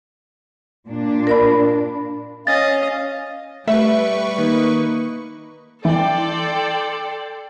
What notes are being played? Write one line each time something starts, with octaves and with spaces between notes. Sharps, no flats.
A#2 D4
A#4 D5 B5
C#4 D#5 F5 A6
G3 A3 B4 E5 C#6
D#3 A#3 D#4
E3 A4 D5 G5 C6